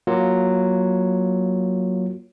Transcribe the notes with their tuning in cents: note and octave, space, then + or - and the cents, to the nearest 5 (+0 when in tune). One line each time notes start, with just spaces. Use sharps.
F#3 +0 A#3 +15 F4 +0